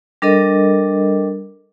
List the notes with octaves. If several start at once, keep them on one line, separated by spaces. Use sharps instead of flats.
G3 D4 A4 A#4 D#5